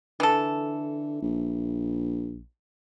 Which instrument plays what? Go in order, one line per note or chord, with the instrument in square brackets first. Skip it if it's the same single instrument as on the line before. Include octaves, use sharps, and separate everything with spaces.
[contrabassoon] D3 [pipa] E3 A4
[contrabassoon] A#1